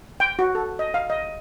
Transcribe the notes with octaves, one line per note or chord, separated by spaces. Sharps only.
G5
F#4
A4
D#5
F5
D#5